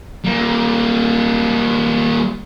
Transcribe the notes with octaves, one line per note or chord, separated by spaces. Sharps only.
G3 A#3